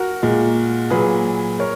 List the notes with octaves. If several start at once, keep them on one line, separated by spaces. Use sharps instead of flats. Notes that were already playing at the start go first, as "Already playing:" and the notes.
Already playing: F#4 A#4
A#2 G#3
A#2 F#3 G#4 B4
A#4 C#5